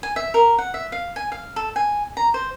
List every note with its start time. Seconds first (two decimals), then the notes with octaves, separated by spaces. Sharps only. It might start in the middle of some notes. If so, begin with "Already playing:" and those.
0.03 G#5
0.16 E5
0.34 A#4
0.58 F#5
0.74 E5
0.92 F5
1.16 G#5
1.32 F5
1.56 A4
1.76 G#5
2.17 A#5
2.34 C5